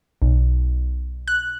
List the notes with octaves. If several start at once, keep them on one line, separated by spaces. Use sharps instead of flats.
B1
F#6